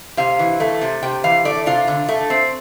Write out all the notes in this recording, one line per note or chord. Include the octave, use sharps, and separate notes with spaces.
C3 F5
E3
A3
C3
C3 G5
E3 F5
A3 D5
C3 F4
D3
A3
C4